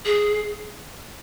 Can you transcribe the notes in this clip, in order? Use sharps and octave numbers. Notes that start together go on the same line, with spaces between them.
G#4